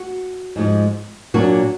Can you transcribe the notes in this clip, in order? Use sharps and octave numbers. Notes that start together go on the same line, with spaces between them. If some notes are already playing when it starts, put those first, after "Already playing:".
Already playing: F#4
G#2 F3 G#3
A#2 F#3 A#3 D4 F#4